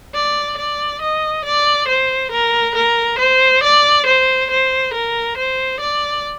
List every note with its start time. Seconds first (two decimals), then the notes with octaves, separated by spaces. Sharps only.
0.14 D5
0.58 D5
1.01 D#5
1.45 D5
1.88 C5
2.31 A#4
2.75 A#4
3.19 C5
3.63 D5
4.06 C5
4.50 C5
4.94 A#4
5.37 C5
5.80 D5